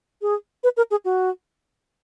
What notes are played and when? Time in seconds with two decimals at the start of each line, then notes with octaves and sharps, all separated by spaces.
0.22 G#4
0.64 B4
0.77 A#4
0.91 G#4
1.05 F#4